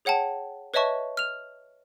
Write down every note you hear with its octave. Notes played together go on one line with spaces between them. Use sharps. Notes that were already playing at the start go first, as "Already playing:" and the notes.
G#4 C#5 F#5 G5 A5
B4 C#5 D#5 E5 A5 C#6
F6 F7